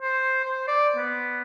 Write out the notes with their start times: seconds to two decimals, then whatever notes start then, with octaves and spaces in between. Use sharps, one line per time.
0.02 C5
0.44 C5
0.68 D5
0.96 B3